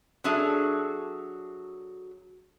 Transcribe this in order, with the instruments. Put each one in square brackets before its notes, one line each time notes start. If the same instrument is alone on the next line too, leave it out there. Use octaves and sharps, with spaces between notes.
[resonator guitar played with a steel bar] F#3 D4 G#4 A4 E5